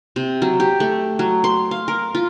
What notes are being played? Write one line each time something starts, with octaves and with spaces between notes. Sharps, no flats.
C3
F#3
G4
A3
F#3
C6
F5
A#4
F4